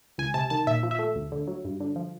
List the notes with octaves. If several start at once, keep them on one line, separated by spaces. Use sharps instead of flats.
C#2 G#5
C3 A5
D#3 A5
A#2 E5
F3
E5
A3
D2
D3
F#3
G2
D3
F3